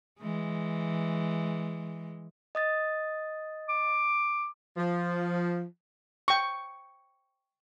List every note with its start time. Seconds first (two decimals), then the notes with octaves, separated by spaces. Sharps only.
0.21 E3 G#3
2.55 D#5 D#6 A6
3.69 D6
4.77 F3
6.28 G5 C#6